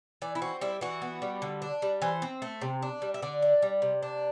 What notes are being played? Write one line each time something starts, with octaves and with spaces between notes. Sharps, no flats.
E3 D5
E4
C4 F#4
G3 E4
E3 F#4
B3
G3
D3
D4
G3
E3 C5
C4
A3
C3
D4
G3
E5
D3 D5
D4
G3
C3
D4